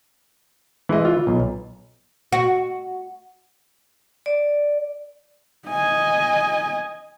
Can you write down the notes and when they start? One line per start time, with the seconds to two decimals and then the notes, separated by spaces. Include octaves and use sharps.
0.89 E3 G#3 D#5
1.05 F4
1.27 B1
2.32 F#4
4.26 D5
5.69 D#5 G#5